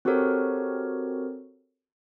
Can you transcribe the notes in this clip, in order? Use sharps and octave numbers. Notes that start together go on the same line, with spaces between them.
C4 F#4 G4 A4 A#4 C#5